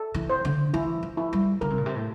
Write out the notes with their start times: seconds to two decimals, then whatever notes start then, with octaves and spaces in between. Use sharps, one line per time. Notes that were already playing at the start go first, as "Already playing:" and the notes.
Already playing: A4
0.14 E3
0.30 C5
0.45 D3
0.74 E3 E4
1.03 F3
1.17 E4
1.33 G3
1.61 D3 A#4
1.70 C3
1.78 A#2
1.86 C3
1.96 A2